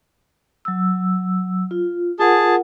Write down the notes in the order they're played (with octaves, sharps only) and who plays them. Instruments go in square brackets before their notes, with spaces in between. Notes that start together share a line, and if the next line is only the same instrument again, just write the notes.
[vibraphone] F#3 E6
F4
[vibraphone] F4 A#4 F#5 [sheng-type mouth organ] G#4 A5